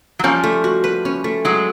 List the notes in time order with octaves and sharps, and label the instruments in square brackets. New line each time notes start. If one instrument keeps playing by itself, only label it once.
[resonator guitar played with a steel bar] F#3
[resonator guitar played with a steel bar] F3 G3 [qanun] C#4
[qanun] A3
F#4
B4
C#4
A3
[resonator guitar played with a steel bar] F#3 G#3 [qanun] F#4